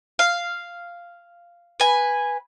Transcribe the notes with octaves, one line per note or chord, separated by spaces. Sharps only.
F5
B4 G#5